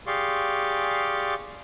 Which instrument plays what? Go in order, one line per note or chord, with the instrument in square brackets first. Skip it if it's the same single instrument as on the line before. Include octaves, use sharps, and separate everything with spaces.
[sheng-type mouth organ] G4 G#4 D5 F5 C6 C#6